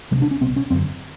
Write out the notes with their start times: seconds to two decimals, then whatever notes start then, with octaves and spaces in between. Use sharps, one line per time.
0.11 D2 C3 G#3
0.22 D4
0.31 C#4
0.41 C2 B2 C4
0.56 C#4
0.70 F#2 C4
0.74 D3